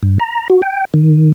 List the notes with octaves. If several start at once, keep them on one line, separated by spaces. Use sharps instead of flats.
G2
A#5
F#4
G5
D#3